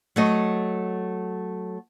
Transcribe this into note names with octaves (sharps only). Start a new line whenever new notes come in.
F#3 A3 D#5